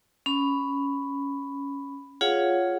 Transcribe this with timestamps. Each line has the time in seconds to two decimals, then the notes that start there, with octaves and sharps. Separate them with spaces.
0.26 C#4 B5
2.21 F4 G#4 C#5 F5 F#5